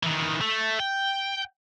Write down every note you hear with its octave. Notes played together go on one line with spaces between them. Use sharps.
D#3 E3
A3
G5